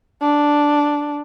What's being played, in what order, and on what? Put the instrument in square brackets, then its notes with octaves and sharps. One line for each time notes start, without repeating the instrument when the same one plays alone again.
[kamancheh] D4